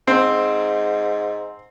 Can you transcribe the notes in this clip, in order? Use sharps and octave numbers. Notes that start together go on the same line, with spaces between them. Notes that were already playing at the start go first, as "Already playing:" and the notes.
G#2 C4